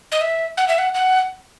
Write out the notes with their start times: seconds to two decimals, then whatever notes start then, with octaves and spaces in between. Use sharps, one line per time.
0.12 D#5
0.21 E5
0.57 F#5
0.68 E5
0.78 F#5
0.94 F#5